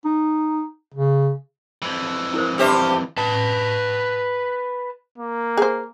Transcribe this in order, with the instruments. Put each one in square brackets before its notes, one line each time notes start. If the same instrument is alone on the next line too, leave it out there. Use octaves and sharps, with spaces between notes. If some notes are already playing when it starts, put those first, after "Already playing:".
[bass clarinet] D#4
C#3
[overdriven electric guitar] F2 E3
[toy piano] E4 A#4 C5
[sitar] G2 G4 C5 [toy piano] B4 E5
[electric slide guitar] B4 A5
[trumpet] A#3
[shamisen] G#4 C5